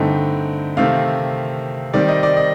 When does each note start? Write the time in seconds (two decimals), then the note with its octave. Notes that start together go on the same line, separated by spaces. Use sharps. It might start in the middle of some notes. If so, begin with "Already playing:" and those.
Already playing: G2 D3 A3 C4 D#4 G5
0.77 C3 D#3 A3 C4 F5
1.93 D#3 G3 C4 D5
2.08 D#5
2.23 D5
2.37 D#5